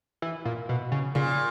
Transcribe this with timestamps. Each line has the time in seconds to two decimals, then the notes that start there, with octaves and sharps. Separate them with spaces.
0.22 E3
0.45 A#2
0.69 B2
0.92 C#3
1.15 A#2 C#3